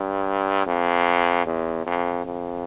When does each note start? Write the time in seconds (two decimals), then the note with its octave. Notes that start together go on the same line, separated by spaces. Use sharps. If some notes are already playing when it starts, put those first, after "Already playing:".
Already playing: G2
0.66 F2
1.46 E2
1.86 F2
2.25 F2